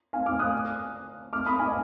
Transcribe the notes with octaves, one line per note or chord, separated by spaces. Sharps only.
F5 G#5
D6 F6
D#6 F#6
D6 F6
B5 D#6
G#5 B5
D#5